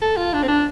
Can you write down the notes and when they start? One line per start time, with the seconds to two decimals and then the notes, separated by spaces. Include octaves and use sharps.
0.02 A4
0.17 F4
0.33 D4
0.43 C4
0.48 D4